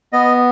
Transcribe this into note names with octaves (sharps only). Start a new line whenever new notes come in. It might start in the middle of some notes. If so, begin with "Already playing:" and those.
B3 D#5